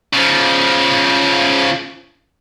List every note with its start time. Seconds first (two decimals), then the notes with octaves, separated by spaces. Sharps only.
0.13 C#3 F3